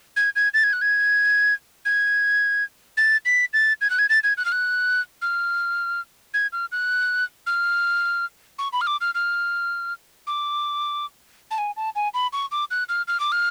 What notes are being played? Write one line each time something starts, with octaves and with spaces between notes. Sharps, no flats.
G#6
G#6
A6
G#6
F#6
G#6
G#6
A6
B6
A6
G#6
F#6
G#6
A6
G#6
F#6
F6
F#6
F6
G#6
F6
F#6
F6
C#6
B5
F6
D6
F6
F6
D6
A5
G#5
A5
G#5
B5
C#6
D6
F#6
F6
F6
D6
F6